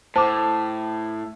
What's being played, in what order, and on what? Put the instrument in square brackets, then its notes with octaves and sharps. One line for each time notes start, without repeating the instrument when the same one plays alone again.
[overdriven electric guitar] A2 [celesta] C5 D6 [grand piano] A5